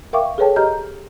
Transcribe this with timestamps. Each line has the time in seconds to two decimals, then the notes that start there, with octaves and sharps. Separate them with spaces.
0.13 A#4 E5 F5 G5 C#6 D6
0.38 G#4 A4 B4 C#5 G5 A5
0.56 G4 D#5 A#5 F6 G6